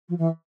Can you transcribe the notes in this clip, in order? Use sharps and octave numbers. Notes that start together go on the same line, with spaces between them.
F3
E3